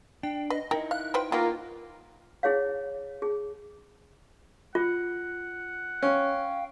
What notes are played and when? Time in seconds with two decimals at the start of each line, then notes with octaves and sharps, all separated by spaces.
0.23 D4 G5
0.50 B4 D#5
0.71 D#4 E4 A#4 G5
0.91 F5 F#6
1.14 F4 B4 C5 G5
1.32 D#3 A#3 B3 F4
2.43 E4 G#4 C#5 F5
3.22 G#4
4.75 F4 F#5
6.03 C#4 F5 G5